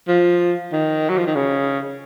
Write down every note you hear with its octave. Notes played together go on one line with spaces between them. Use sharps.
F3
D#3
F#3
F3
D#3
C#3